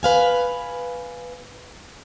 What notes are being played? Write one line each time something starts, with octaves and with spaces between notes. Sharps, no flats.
B4 F5 G#5